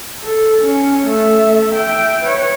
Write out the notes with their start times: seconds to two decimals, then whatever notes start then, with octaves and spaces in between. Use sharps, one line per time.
0.22 A4
0.62 C#4
1.06 A3 E5
1.73 E5 G5
2.22 B4 C#5